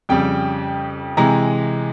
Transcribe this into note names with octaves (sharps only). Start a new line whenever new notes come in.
F2 C#3 G3 G5
C3 E3 G#3 A#5